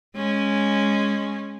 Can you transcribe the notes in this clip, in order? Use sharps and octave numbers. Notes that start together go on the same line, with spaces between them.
G#3 C#4